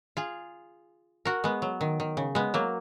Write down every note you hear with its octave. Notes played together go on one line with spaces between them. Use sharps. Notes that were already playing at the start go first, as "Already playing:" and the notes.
F4 G#4
F#4 A#4
G#3 B3
F#3
D#3
D#3
C#3
G#3 B3
F#3 A#3